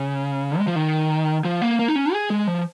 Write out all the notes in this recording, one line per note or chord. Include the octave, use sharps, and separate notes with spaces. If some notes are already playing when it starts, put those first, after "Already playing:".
Already playing: C#3
G#3
F3
D#3
F3
A#3
A#3
D#4
C#4
G#4
G#3
F3